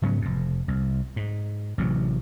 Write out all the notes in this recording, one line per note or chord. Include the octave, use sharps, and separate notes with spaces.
G#2 C#3 F#3 B3
F1 F2
C2
G#2
A1 G2 C3 F#3